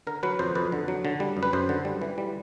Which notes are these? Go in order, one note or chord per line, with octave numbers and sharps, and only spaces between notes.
D3 A#4
F#3 B4
F2 C5
F2 B4
D3
F#3
D3
G3
F#2
B4
F#2 C5
D3
G3
E3
G3